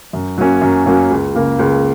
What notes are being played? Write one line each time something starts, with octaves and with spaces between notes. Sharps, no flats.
F#2
F#3 A#3 C#4
F#2
F#3 A#3 C#4
C#2
C#3 A#3
C#2